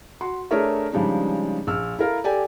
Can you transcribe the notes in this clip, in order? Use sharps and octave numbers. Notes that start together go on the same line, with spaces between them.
F#4 C6
A3 D4 G#4 A#4 C#5 E5
C#3 F3 G3 G#3 D4 D#4
A#1 E6 F6
E4 A4 A#4 F5
G4 A4 D5 G5 G#5